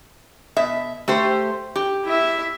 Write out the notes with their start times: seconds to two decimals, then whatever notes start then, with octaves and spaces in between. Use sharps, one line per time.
0.56 B2 E5
1.08 A3 G4 C5
1.76 G4
2.04 E4 E5